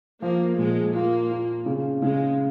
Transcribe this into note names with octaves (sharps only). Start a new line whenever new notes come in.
F3 A#3
A#2 G#3
A#3 F4
F4
C#3
C#3 G#3